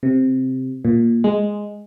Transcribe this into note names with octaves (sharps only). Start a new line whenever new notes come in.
C3
A#2
G#3